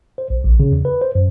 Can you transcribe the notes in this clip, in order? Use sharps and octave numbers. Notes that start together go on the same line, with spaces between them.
C5
B1
A#1
C#3
E2
B4
C5
F#2